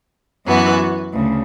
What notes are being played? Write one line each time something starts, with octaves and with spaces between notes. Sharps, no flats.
F#2 E3 B3 F#4
D2 C#3